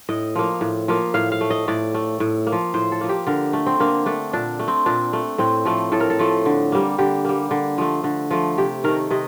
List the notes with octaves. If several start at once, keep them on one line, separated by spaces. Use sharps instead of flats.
A2 D#5
F3 A#3
A2
F3 A#3
A2 F5
F5
A3
D#5
A2 D5
A3
A2
A#3
F3
A2 C5
A4
F3 A#3
G4
D3 A#4
A3
C4
D3 A#3
A3 D4
A#2 D4
A3
C4
A#2 D4
A3
A2 C4
F3 A3
A2 A4
A#4
A4
F3 A3
D3
G3 A#3
D3 G4
G3 A#3
D3
F3 A3
D3
F3 A3
C3 G4
D#3 A3 A#4
C3 D#5